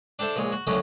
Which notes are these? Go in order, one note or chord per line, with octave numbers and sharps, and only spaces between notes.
D4 G4 A4 C5 E5
A#1 A#2 G#3 C#5
F#4
F#2 A2 D3 D#3 F#3 C#4